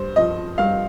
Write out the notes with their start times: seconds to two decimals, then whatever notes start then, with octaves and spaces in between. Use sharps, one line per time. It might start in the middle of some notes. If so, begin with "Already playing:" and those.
Already playing: G2 C5
0.16 F3 D#5
0.58 G2 F5